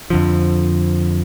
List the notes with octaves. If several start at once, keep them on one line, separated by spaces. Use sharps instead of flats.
F2 D3 F3